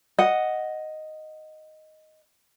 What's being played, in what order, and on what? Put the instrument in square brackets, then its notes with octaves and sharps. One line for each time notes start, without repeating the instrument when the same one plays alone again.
[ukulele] D#5 F#5